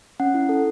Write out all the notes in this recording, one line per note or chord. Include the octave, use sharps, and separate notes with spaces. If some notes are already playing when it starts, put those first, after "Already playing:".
C#4 F#5
E4
A4